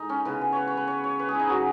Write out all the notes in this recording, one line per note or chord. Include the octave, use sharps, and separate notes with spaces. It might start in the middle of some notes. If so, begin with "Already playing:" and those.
Already playing: A2 G#3 D#4
C#4
C#3 E3 B3 B4
B4
B4 C#5
C#5
B4
C#5
C#5
B4
G#4
D#4 E4
C#3 F#3 C#4 F#4